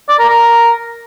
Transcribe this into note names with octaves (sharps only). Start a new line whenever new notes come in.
D5
A#4
A#4